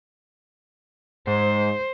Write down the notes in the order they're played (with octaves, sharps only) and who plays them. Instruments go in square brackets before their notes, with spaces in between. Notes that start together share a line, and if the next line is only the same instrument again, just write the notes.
[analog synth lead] G#2 [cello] C5